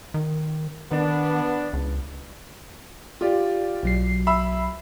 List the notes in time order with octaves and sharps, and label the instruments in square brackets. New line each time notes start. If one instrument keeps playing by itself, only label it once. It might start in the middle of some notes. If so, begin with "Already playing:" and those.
[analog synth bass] D#3
[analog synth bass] D#3 [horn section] B3 D4
[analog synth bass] C#2
[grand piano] F4 G4 D5
[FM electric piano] B1 F#3 C7
[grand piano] E5 B5 E6